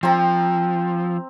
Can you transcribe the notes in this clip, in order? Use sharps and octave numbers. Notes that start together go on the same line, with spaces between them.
F3 C4 A#5